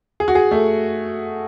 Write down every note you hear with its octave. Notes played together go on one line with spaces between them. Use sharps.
G#4
F#4
G#4
A3